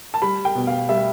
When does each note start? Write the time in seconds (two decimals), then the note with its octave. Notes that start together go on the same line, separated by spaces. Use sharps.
0.14 A5
0.22 G3 B5
0.45 G5
0.55 B2
0.67 F5
0.89 G3 E5